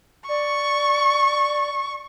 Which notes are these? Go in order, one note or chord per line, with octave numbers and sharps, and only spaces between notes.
D5 C#6